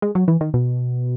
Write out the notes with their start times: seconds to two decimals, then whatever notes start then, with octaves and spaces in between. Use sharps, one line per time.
0.02 G#3
0.15 F#3
0.28 E3
0.41 D#3
0.54 B2